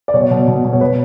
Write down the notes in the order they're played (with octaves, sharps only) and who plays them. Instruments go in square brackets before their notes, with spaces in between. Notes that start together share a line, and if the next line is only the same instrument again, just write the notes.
[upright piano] D5
B2 C#5
B2
B2
B2
C#5
B2 B4